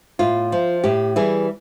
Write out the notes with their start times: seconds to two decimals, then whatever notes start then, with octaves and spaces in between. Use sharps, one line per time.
0.19 A2 F4
0.52 F3
0.84 A2 G4
1.16 E3 G3 G#4